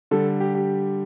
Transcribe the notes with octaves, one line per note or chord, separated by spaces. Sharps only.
D3 G3 A4
G4
G4